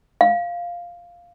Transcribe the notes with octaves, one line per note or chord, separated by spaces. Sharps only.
F5